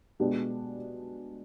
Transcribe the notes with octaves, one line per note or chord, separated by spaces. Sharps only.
B2 G#3 B3 D4 G4